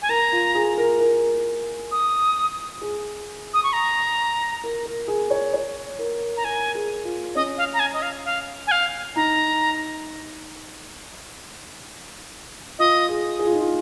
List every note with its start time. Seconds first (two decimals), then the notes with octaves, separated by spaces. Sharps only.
0.02 G#5
0.09 A#4 A#5
0.32 F4
0.55 G#4
0.78 A#4
1.01 A#4
1.92 D#6
2.81 G#4
3.54 D#6
3.64 C#6
3.73 A#5
4.64 A#4
4.86 A#4
5.08 G#4
5.30 C#5
5.54 C#5
5.99 A#4
6.37 A#5
6.44 A#4 G#5
6.75 G#4
7.05 F4
7.35 C#4 D#5
7.58 F5
7.73 A#5
7.80 G#5
7.93 D#5
8.02 F5
8.25 F5
8.67 G#5
8.71 F5
9.16 D#4 A#5
12.79 F4 D#5
13.09 G#4
13.39 G#4
13.46 F4
13.53 D#4
13.60 F4